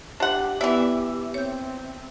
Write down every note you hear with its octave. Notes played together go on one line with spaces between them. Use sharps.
D4 G4 F#5
E3 B3 G4 D5 E5
C4 C#5 G6